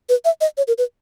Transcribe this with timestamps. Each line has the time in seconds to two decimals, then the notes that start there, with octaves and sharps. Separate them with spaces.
0.09 B4
0.25 E5
0.41 D#5
0.57 C#5
0.68 A#4
0.78 B4